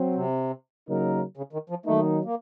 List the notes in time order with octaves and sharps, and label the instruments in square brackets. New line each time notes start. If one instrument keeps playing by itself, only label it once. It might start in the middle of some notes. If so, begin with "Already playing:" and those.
Already playing: [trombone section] F#3 C4
[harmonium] C3
[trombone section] C#3 F#3 A#3 D#4 A#4
[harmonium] C#3
D#3
F3
[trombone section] D#3 F#3 A#3 D#4 [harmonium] A3
[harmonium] A#3